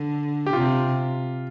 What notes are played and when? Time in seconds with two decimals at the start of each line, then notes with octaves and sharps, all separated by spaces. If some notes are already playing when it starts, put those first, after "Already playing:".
Already playing: D3
0.46 G4
0.53 C3 F4